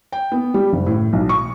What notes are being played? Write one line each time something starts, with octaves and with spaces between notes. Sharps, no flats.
G5
B3
G3
F#1
A2
B1
C#6